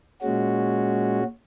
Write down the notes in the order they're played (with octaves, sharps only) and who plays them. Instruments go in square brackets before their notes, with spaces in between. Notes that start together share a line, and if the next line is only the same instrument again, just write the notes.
[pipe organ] A#2 G#3 C#4 F#4